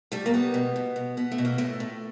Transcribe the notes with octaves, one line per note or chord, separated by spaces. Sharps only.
G3 A3
A#3
G3 B3
B2
B2
B2
B2 B3
A3
B2
A#3
A2 A3
A2